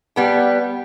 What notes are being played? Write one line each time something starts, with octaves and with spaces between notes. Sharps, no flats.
G3 B3 G5